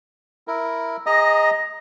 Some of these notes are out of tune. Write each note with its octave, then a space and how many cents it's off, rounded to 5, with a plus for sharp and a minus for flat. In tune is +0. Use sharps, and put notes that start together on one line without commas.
E4 +0 A#4 +0
G#4 -30 D#5 +5 A#5 +0